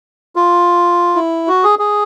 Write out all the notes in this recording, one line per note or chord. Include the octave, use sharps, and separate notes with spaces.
F4
E4
F#4
G#4
G#4